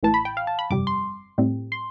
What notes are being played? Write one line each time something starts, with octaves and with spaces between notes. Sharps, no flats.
A1 A2 E3 A5
B5
G5
F5
A5
B5
G1 F2 C3 G3 D6
C6
A2 G3 C4
C6